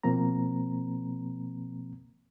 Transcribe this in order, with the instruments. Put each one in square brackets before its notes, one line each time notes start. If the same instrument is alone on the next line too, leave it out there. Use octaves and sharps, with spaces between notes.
[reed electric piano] B2 F3 A#3 C4 A#5